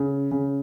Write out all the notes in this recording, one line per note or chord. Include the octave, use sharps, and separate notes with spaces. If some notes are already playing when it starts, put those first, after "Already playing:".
Already playing: C#3
C#3